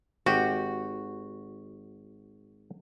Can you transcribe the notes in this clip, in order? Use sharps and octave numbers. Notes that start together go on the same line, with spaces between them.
G#1 F#4 G4 G5